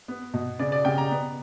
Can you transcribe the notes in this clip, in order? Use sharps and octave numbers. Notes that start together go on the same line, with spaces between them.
B3
B2
C#3 D5
D5
C#3 G5
A#5
B3